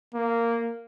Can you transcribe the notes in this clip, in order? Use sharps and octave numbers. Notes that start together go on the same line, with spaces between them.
A#3